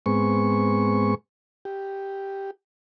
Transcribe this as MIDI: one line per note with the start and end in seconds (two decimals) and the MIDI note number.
0.06 1.15 44
0.06 1.15 56
0.06 1.15 59
0.06 1.15 60
0.06 1.15 85
1.65 2.51 67